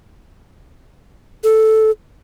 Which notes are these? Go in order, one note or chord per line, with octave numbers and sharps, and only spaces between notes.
A4